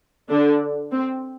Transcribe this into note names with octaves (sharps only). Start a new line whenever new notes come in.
D3 D4
C4